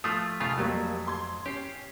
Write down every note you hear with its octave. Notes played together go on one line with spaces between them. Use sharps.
F3 A3 F4 D#6
F1 C#3 A3 F4
F2 F#3 G3 A3 A#3
C6 G#6
C#4 G4 C7